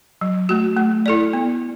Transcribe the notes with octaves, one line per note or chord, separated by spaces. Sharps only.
F#3
A3 F#4
A3
E4 A4 D5
B3